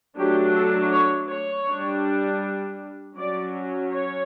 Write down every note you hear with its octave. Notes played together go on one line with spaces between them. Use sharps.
F#3 A3 D4 G4
A4
C#5
C#5
D4
G3
F#3 C#4 D5
C#5